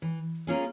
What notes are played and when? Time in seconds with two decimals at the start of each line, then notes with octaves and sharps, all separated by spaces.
0.02 E3
0.47 A#3 C#4 F4 G#4